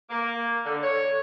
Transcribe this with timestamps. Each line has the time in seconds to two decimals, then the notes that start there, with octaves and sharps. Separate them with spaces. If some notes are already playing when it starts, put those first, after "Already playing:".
0.10 A#3
0.66 D3
0.83 C#5